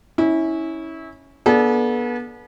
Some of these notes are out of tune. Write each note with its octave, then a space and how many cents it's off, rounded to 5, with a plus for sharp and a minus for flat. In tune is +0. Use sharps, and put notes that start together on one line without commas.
C#4 +0 E4 -25
B3 -35 D4 -5 A4 -40